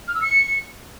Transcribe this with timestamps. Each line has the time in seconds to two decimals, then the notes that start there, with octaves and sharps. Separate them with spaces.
0.08 F6
0.15 E6
0.22 C#7